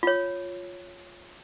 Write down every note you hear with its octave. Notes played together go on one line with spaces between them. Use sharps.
F4 C#5